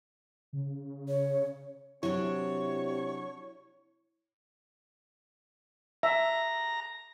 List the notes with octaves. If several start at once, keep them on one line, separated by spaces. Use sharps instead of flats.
C#3
C#5
C3 F#3 D4 E4 C#5
E5 A#5